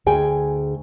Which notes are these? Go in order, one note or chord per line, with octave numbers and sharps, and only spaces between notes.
D2 G#4 G5 G#5